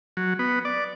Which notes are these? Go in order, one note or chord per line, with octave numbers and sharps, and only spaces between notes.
F#3
B3
D5